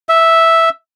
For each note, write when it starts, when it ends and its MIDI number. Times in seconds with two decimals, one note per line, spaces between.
0.09 0.69 76